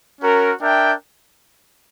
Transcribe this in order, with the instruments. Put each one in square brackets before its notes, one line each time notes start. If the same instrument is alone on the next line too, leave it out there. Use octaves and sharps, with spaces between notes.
[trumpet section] C#4 F#4 A#4
D4 A#4 E5 G5